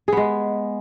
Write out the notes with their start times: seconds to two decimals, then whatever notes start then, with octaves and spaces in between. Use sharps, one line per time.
0.08 G#4
0.13 B3
0.17 G#3